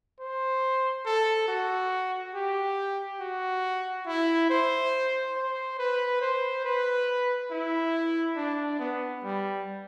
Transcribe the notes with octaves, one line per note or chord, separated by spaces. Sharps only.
C5
A4
F#4
G4
F#4
E4
C5
C5
B4
C5
B4
E4
D4
B3
G3